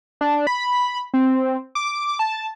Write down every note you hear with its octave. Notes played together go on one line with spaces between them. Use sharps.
D4
B5
C4
D6
A5